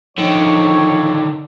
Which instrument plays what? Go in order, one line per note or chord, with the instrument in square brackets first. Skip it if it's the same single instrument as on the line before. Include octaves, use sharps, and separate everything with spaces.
[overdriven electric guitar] D3 D#3 [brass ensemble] F3 C#5